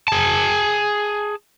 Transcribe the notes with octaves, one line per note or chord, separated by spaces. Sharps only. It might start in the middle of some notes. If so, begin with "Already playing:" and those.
G#4 A5